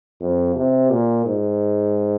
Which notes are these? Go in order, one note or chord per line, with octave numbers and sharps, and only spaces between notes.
F2
C3
A#2
G#2